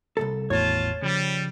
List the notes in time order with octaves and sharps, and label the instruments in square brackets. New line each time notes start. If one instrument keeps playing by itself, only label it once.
[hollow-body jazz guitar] C2 G#2 A4
[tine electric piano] G#1 E2 A2 [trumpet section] F4 A5 [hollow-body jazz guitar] C#5
[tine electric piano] C#3 F3 [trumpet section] G3